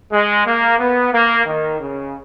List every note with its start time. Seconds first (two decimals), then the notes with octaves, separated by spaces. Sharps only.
0.12 G#3
0.45 A#3
0.79 B3
1.12 A#3
1.45 D#3
1.79 C#3